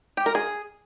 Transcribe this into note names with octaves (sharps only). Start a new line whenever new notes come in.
G4
A#4
G#4